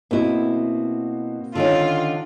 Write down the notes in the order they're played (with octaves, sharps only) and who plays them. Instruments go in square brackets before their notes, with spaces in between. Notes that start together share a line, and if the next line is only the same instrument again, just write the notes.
[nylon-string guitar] B2 E4 [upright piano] A#3 C4 F#4
[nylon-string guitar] D3 D#3 C#4 [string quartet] F4